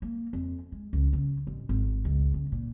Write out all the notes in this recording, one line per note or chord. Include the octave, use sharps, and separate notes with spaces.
A#3
F2
G#3
C#2
C#3
A1
G#1
C#2
C#3
A#2